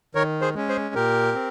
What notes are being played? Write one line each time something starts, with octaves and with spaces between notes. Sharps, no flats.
D#3 A#4 C#5
G#4 C5
G#3 C#4
G#4 C5
A#2 G4 A#4
C4